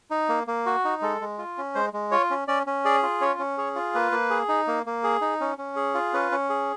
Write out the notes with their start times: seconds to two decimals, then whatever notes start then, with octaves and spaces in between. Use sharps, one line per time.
0.11 D#4
0.29 A#3
0.47 A#3
0.66 F#4
0.85 D#4
1.02 G#3 A4
1.21 G#3
1.38 F4
1.58 C#4
1.75 G#3 C5
1.93 G#3
2.11 F4 C#5
2.30 C#4
2.48 C#4 D5
2.67 C#4
2.85 G#4 D5
3.03 F4
3.21 C#4 C#5
3.39 C#4
3.58 G#4 C#5
3.75 F4
3.95 A#3 B4
4.12 A#3
4.30 G#4
4.49 D#4
4.67 A#3
4.86 A#3
5.04 G#4
5.21 D#4
5.41 C#4
5.58 C#4
5.76 G#4
5.94 F4
6.13 C#4 B4
6.32 C#4
6.50 G#4